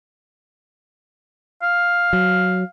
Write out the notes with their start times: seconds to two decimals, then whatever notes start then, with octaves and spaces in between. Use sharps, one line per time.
1.63 F5
2.13 F#3